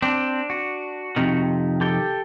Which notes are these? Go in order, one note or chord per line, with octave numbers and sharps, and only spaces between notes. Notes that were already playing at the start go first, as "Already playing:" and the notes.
C4 D4
F#4
F2 C3 D#3
G4 A4 G5